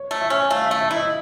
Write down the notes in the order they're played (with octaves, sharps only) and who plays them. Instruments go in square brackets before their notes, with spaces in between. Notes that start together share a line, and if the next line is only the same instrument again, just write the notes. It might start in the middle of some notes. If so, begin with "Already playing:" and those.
Already playing: [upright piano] C#5
[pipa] A3
[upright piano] E5
[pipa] C#4
[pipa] A3 [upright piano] F5
[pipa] A3 [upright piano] E5
[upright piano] E5
[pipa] E4
[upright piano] D#5